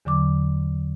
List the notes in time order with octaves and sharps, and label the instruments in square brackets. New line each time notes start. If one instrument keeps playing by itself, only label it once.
[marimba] E2 D3 F#3 D6